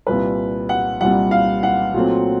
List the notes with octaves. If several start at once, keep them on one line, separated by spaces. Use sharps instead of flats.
C2 A#2 G3 B4
F#5
C2 A#2 G3 F#5
F5
F#5
A#2 F#3 A3 C4